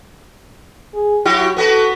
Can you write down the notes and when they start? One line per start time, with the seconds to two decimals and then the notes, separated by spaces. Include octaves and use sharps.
0.94 G#4
1.25 F#3 E4 F#4 G4
1.57 B3 F#4 A4 B4